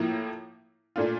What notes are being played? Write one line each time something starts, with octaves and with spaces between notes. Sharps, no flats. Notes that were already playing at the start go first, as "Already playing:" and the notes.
Already playing: A2 F3 A#3 E4
A#2 A3 D4 F4